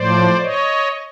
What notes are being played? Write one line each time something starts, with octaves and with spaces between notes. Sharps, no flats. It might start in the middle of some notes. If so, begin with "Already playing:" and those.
Already playing: A2 F3 C5 D5
C#5 D#5